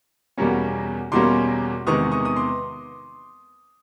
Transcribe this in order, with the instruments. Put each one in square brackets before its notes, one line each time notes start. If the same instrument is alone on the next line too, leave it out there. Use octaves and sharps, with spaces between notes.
[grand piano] E2 B2 G3 A#3 C#4
E2 B2 G3 A#3 C#4 C6 D6
E2 C3 D#3 G#3 B3 C#6 D#6
C#6 D#6
D#6
C6 D6